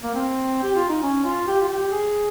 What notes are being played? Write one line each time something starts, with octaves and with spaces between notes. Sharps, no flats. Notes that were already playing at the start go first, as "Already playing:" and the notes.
A#3
C4
G4
F4
D#4
C#4
F4
G4
F4
G4
G#4